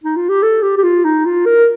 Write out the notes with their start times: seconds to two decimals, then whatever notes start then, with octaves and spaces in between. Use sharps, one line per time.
0.03 D#4
0.16 F4
0.29 G4
0.42 A4
0.62 G4
0.77 G4
0.83 F4
1.05 D#4
1.26 F4
1.45 A#4